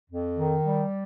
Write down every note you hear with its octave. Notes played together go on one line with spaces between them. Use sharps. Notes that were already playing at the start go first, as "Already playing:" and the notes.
F2
D#3
G3